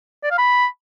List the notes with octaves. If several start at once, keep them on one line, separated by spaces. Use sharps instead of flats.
D5
F5
B5